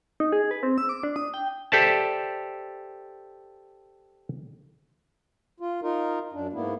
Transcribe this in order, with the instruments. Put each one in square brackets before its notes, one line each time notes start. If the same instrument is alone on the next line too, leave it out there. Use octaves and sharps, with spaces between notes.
[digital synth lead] D#4
G#4
B4
C4
E6
D6
D4
D#6
G5
[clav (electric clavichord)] G4 A4 C5 D5 E5 A5
[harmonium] F4
D#4 F4 A#4
F#2 D4
G#2 A#3 B3 E4